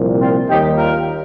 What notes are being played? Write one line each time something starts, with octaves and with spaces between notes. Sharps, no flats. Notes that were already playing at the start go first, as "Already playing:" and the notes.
Already playing: C2 A#2 F3
C4 F4
D#2 D#3 G3 D#4 G4
F4 A#4